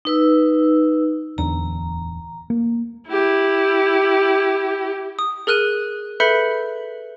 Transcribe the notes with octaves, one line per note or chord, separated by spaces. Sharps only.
D#4 B4 E6
D1 E2 D4 A#5
A#3
E4 G4
D#6
G#4 A#4 F6 F#6 D#7
A4 B4 E5 B5 G6 C#7